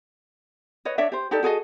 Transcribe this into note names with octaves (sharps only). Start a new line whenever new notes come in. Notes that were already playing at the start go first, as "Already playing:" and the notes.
B4 C#5 D#5
D4 C#5 D5 E5
G4 C5
D#4 G4 A4 D5
F#4 G#4 A4 D#5